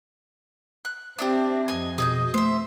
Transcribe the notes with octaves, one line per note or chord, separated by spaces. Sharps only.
F#6
C4 D4 D#4 G4 E5
F2 D#5 G#5
B2 G#4 D#5 G6
A3 C5 E5